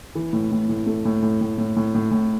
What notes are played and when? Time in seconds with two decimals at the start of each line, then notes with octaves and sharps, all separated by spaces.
0.15 E3
0.33 A2
0.51 A2
0.69 A2
0.86 A3
1.05 A2
1.22 A2
1.41 A2
1.58 A2
1.76 A2
1.95 A2
2.11 A2